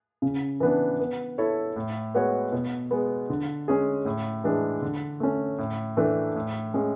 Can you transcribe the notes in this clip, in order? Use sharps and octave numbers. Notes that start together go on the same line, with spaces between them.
C#3
E3 B3 D4
B3
E4 A4 C#5
A2
G#3 B3 F#4 C#5
B2
G#3 B3
D3
G#3 C#4 G#4
A2
E3 G#3 D4
D3
A3 C#4
A2
E3 A3 D4
A2
G#3 C#4